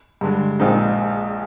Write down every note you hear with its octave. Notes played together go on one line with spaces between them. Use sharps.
G2 D3 G#3
A#1 A#2 G#3 C4 D#4